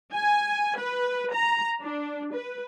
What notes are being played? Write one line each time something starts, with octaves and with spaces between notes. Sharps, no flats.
G#5
B4
A#5
D4
B4